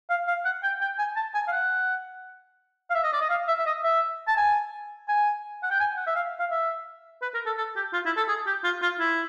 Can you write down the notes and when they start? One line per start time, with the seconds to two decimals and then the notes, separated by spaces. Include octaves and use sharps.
0.09 F5
0.27 F5
0.45 F#5
0.63 G5
0.81 G5
0.98 G#5
1.16 A5
1.34 G#5
1.47 F5
1.52 F#5
2.90 F5
2.94 E5
3.03 D#5
3.13 D5
3.21 D#5
3.29 F5
3.48 E5
3.58 E5
3.66 D#5
3.83 E5
4.27 A5
4.36 G#5
5.08 G#5
5.63 F#5
5.71 G5
5.80 G#5
5.97 F#5
6.06 E5
6.15 F5
6.39 F5
6.50 E5
7.22 B4
7.34 A#4
7.46 A4
7.57 A4
7.76 G4
7.93 F4
8.06 E4
8.17 A4
8.28 G#4
8.46 G4
8.64 F4
8.82 F4
8.99 E4